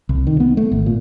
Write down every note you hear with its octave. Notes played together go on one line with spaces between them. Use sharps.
C2
D#3
B3
A3
G#1
A#2